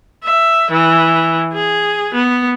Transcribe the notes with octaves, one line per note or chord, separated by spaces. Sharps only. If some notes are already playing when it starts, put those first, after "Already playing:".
E5
E3
G#4
B3